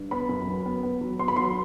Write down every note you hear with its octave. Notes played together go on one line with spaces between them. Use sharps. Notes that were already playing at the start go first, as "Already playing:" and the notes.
Already playing: G2
B3 B5
F#2
F#3
B3
B3
F#3
B3 C6
B5
F#3 C6